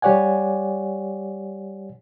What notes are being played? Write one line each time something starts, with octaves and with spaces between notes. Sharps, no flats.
G3 G4 C#5 D5 F#5 G#5